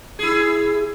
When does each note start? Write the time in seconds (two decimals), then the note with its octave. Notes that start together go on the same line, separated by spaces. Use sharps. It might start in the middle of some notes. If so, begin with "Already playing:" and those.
0.19 E4 G#4